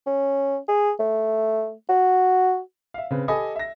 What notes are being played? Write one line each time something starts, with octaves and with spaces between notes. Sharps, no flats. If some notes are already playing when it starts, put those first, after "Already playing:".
C#4
G#4
A3
F#4
E5 F5
C#3 C4 B4
G4 A4 D#5 G#5 B5 D#6
E5 A#6